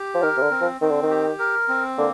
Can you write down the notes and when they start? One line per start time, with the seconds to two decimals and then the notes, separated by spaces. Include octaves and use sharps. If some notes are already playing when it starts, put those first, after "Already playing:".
Already playing: G4
0.14 F3
0.22 D#3 A#4
0.37 C3
0.42 D3
0.51 C4
0.61 F3
0.81 D#3 C4
0.91 D3
1.02 D#3
1.11 G4
1.39 A#4
1.68 C4
1.97 D3 A#3